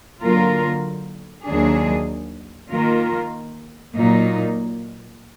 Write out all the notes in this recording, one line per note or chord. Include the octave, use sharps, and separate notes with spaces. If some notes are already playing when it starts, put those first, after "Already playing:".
D3 F#3 A#3 F4 A#4
D#2 D#3 F#3 D4 G#4
D#3 A#3 F4 A#4
A#2 F#3 A#3 D#4